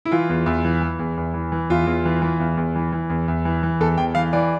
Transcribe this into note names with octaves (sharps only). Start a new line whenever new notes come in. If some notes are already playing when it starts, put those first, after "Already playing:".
E4
E3 F4
E2
E2
E3
E3
E2
E2
E3
E3
E2 F4
E2
E3
E3
E2
E2
E3
E3
E2
E2
E3
E3
E2 A4
E2 G5
E3 F5
E3 D5